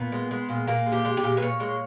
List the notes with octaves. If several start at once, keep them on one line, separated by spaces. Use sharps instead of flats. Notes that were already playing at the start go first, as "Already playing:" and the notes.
Already playing: A#2 B3
G#3
G#3
A#2
A#2 A#3
G#3
G4
G#3
G4
A#2
B4
A#2 C#5
G#3